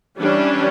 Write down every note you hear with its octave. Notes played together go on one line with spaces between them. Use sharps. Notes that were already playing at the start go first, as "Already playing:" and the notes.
E3 G3 C#4 D4